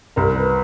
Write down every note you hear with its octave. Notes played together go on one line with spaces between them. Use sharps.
C2 A#4
B4